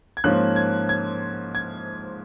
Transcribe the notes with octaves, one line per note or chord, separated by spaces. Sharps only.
G#6
G#2 F3 A#3 C#4 F#6
G#6
G#6
G#6